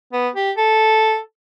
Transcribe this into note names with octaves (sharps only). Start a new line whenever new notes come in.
B3
G4
A4